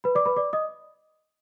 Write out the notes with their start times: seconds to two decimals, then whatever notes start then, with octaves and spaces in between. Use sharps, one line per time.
0.04 B4 B5
0.15 D5 D6
0.26 B4 B5
0.36 D5 D6
0.53 D#5 D#6